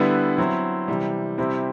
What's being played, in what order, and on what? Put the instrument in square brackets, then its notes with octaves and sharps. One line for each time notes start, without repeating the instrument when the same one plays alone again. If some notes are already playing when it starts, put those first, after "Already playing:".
Already playing: [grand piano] D3 G3 B3 E4 B4
F#3 C4 E4
C3 E3 G3
C3 G3 C4 E4